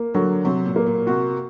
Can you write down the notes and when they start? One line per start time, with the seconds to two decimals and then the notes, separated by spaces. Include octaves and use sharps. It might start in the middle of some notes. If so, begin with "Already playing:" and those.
Already playing: A#3
0.14 D3 F#3
0.45 C3 F#3
0.66 A#2
0.76 A#3
0.86 A#2
1.07 C3 F#4